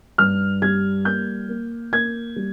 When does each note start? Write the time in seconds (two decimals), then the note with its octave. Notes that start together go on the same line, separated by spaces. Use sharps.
0.18 G2 F6
0.62 G3 G#6
1.05 A#3 G6
1.49 A#3
1.92 A#3 G#6
2.36 G3